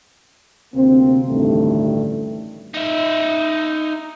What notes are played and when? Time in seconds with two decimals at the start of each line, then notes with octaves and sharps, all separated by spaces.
0.74 D2 C3 A#3 C4
1.28 A1 D2 G2 D#3 G3 A3
2.74 D#4 E5